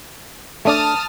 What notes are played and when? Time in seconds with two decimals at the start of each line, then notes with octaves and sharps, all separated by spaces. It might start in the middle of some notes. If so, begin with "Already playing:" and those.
0.65 A3 D4 D5 A5 D#6 F6